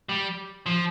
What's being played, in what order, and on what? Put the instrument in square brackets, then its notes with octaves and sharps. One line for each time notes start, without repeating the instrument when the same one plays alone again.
[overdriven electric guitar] G3
F3